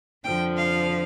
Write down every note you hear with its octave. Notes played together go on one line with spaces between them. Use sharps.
F2 D3 F3 G5
F5